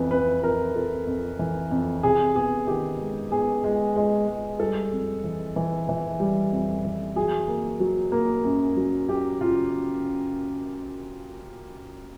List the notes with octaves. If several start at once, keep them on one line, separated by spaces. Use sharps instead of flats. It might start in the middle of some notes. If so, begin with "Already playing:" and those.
Already playing: F2 E3 B4
F2 B4
F2 A#4
F2 A4
F2
E3
F2
C3 G#4
B3 G#4
D#3 G4
G#3
B3 G#4
G#3
G#3
G#3
G3 A4
F2
E3
E3
E3
G3
F2
E3
F#3 G#4
A#3
F#3
A#3
F#2
F#3
F#2 G4
C#3 F4